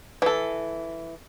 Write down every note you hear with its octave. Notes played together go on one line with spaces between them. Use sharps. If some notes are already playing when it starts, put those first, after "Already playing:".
E3 A4